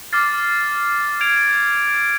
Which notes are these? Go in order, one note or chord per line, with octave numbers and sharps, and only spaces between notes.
D6 F6 A6 C7
G#6 D7 F7